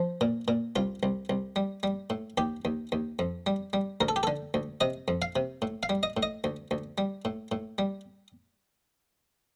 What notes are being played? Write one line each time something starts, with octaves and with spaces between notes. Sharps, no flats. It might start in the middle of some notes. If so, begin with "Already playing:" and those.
Already playing: F3
A#2
A#2
C2 F4
C2
C2
G3
G3
A2
D#2 G4
D#2
D#2
F2
G3
G3
D2 A#4
A4
G4
A4
D3
D2
C3 D#5
F2
F5
C3
A2
F5
G3
D#5
A2
D#5
D2
D2
G3
A2
A2
G3